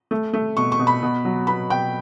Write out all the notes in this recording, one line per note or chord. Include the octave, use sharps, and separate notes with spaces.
A3
A3
B2 C#6
C#6
B2
B5
B2
F#3
B3 B5
B2 G5